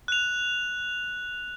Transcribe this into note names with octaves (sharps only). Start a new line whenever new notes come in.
F#6 F7